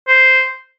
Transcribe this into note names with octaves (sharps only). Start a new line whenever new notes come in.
C5